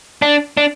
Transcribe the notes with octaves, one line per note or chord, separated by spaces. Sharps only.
D4
D4